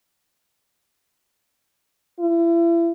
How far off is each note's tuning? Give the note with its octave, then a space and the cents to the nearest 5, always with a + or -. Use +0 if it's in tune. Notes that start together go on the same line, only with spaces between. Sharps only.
E4 +35